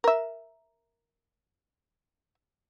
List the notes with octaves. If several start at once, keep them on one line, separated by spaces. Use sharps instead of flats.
A#4 E5